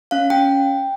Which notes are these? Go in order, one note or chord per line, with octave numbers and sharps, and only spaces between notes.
C#4 F5
C#4 G5